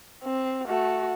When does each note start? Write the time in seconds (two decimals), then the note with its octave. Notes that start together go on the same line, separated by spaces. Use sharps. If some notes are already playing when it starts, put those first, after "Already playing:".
0.23 C4
0.68 A3 F#4